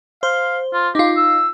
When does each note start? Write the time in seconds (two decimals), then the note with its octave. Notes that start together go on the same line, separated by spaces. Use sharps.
0.23 C5 F5
0.73 F4
0.95 D#4 F4 G4
1.17 E6